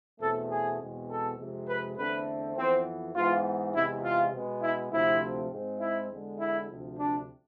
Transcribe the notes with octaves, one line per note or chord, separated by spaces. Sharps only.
E2 B2 A3 C4 A4
G#4
E2 B2 G#3 C4
A4
F2 C3 G#3
B4
E2 D3 A3 C4 B4
F2 E3 B3 C4
G#2 E3 B3 F4
E2 C3 G#3 E4
F4
B2 G#3 B3
E4
D2 C3 F3 A3 C4 E4
G#2 G#3 C4
E4
E2 D3 G#3
E4
D2 C3 F3
D4